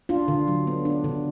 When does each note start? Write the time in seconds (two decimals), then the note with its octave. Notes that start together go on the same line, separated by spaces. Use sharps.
0.09 D4 F4
0.28 D3
0.48 F#3
0.67 B3
0.85 D4
1.04 D3